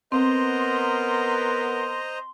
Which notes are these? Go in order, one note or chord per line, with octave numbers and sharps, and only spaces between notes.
B3 C4 A#4 C5 D#5 A#5 C6